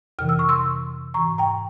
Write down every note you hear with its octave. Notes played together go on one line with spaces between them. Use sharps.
F2 C3 E3 F6
E6
C#6
C6 E6
G#2 E3 A#5 C#6
G5 A#5